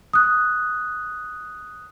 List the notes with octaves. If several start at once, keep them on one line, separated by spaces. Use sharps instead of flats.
D#6 F#6